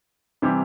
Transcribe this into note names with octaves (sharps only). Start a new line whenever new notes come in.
C3 E3 G3 C4 G4